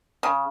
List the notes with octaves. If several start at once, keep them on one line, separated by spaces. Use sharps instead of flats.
C#3